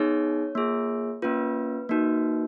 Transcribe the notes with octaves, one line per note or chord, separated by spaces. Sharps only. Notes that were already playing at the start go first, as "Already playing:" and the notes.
Already playing: B3 D#4 G#4 C#5
A#3 F4 G#4
A#3 C#4 F4 B4
A#3 D#4 F#4